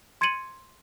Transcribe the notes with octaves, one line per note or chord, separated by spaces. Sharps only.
C6 G#6 A6 C#7 D#7 F#7